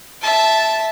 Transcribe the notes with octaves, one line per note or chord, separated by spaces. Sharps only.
E5 A5